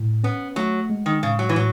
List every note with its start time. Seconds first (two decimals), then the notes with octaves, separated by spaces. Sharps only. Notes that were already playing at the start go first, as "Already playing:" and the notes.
Already playing: A2
0.24 B3 C#4
0.56 F#3 A3
0.90 G#3
1.06 D#3
1.23 A2 C#3
1.39 F#3
1.49 E3
1.56 A2 F#3